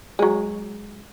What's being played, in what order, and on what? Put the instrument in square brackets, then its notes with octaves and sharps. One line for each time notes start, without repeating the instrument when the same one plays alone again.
[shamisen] F#3 G#3